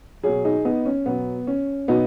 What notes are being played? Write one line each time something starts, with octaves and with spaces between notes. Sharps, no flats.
B2 F#3 G#4 C#5
D#4 G#4
B3 D#4
C#4
B2 F#3 B3
C#4
B2 F#3 B3 D#4